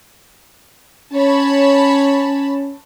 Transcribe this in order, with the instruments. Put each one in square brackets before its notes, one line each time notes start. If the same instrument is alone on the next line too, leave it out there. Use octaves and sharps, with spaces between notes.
[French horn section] C#4 [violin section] C#5 A5 B5